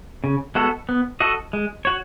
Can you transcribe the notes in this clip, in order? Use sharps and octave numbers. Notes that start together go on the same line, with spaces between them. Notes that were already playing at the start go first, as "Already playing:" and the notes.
C#3
G#3 B3 F#4 A4
B3
F#4 A4 D#5
G#3
F#4 C#5